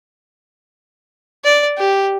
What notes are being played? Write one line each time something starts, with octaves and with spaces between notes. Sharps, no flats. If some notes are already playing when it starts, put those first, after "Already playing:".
D5
G4